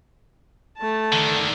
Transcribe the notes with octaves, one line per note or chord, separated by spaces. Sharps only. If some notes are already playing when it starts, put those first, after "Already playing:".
A3 A5
D3 D#3